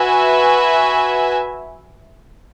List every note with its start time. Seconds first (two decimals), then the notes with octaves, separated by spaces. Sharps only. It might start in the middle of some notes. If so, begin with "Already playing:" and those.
Already playing: F#4 B4 E5 G#5